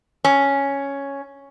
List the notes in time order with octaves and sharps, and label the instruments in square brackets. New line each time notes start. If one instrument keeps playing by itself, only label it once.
[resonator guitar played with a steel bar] C#4